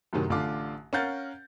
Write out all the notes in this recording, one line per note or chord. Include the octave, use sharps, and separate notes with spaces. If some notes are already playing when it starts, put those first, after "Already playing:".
F#2 A2 C3 D#3 F#3
A1 D3 F4 D6
C#4 A#4 F5 F#5 G6 A6